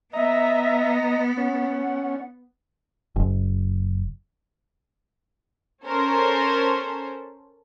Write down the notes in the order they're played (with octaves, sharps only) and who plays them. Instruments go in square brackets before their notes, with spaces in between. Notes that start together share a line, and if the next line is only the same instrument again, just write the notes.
[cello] B3 [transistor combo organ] D#5 A#5 [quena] E5
[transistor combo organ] C#4 [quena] F#5
[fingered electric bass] F#1
[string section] C#4 A4 A#4 C5